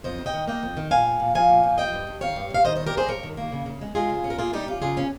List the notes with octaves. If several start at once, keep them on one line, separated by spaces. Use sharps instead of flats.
F2 C5 D#5
D#3
D#5 G5
D#3
A#3 D#5 G5
F2
D#3
A#2 F5 G#5
F3
A#2
F3 F5 G#5
A#2
F3
G2 D#5 G5
G2
G2
D#3 C#5 F5
G2
G2 F5
D#3 C5 D#5
G3 C5 D#5
G4 A#4
G2 G#4 C5
G2 A#4 C#5
D#3
A#3
C#3
C#3
G#3
G#3 F4 G#4
C#3
C#4
A#4
A#3 F4 G#4
G3 D#4 G4
C#4 F4
C#3 F4 G#4
C#4